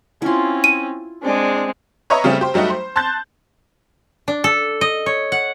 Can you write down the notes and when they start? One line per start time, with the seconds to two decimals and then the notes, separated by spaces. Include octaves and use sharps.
0.22 C4 C#4 E4 F4
0.64 D#7
1.23 G#3 C4 D4 D5
2.10 B4 C#5 D#5 E5 A#5 C#6
2.24 C#3 G3 A3 C4 C#4
2.41 G4 C5
2.54 F#3 G3 A3 D#4 F#4
2.70 C5
2.96 A5 C6 F#6 G6 A6
4.28 D4
4.44 A4
4.81 D#5
5.06 C#5
5.32 F#5